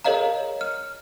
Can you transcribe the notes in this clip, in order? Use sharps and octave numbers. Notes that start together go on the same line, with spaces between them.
G#4 A#4 C#5 D#5 F5 A#5
F6